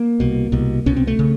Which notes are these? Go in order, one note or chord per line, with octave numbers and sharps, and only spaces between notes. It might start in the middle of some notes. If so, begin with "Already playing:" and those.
Already playing: A#3
C2 B2
C2 B2
C2 B2 C#4
C4
A3
C#3